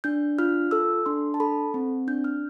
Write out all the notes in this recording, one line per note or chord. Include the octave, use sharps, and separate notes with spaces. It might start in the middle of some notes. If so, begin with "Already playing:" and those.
D4 G6
F4 F6
A4 E6
D4 C6
A5
A4 B5
C4
D4 G6
F6